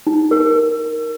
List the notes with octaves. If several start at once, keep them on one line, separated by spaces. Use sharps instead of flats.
D#4
A#4